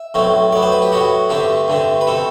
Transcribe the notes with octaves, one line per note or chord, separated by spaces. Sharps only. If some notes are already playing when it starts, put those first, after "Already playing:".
Already playing: E5
B1 A2 F#3 A3 C4
A2 F#3 B3 D5
C5
B4
G4
A2 F#3 B3 F#4
G2 D3 A3 C4 G4
G2 D3 A3 C4
B4
B2 A3 C4 A4